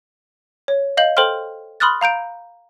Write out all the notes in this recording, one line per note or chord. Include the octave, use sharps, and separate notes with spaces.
C#5
D#5 F5 G6 F#7
A4 C5 G5 C6 F6
B5 C6 D#6 F6 F#6 A6
F5 A#5 G6 D7